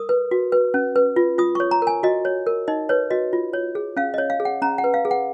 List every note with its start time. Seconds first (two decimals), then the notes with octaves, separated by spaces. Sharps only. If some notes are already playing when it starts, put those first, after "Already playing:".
Already playing: A#4 D#6
0.09 B4
0.31 F#4
0.52 B4
0.74 C#4
0.96 B4
1.16 F4
1.38 F4 D#6
1.55 C#5 C#6
1.71 A#5
1.82 A#4 G#5
2.03 F#4 D#5
2.25 C#5
2.47 A#4
2.68 D#4 D#5
2.89 B4 C#5
3.11 F#4 D#5
3.33 F4
3.53 C#5
3.75 G#4
3.97 C#4 F5
4.14 C#5 D#5
4.30 F5
4.40 G#4
4.45 F#5
4.62 C#4 A#5
4.78 F#5
4.84 B4
4.94 F5
5.05 G#4
5.11 F#5